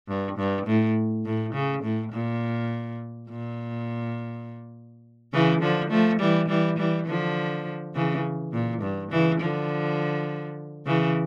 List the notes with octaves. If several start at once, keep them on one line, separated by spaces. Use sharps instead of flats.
G2
G2
A2
A2
C#3
A2
A#2
A#2
C#3 E3
D3 F3
F3 A3
E3 G3
E3 G3
E3 G3
D3 F3
C#3 E3
A#2
G2
C#3 E3
D3 F3
C#3 E3